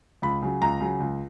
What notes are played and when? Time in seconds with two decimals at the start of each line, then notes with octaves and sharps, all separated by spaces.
0.22 C#2 B5
0.42 C#3 F#3
0.62 C#2 A#5
0.80 C#3 F#3
1.00 C#2